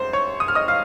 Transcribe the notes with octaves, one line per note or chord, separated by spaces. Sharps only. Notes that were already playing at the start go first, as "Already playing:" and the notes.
Already playing: F#2 C5 C6
C#5 C#6
D#6
F6
D#5 D#6
F5 F6